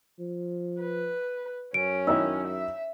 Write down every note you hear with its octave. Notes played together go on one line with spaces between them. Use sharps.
F3
B4
F#2 C#4 D7
D#3 D#4 E4 E6
E5